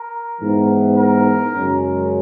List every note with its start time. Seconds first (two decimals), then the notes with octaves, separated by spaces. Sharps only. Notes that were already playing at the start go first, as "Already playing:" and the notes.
Already playing: A#4
0.41 G#2 E3 B3
0.98 A#4
1.54 F#2 C#3 G#3 C#4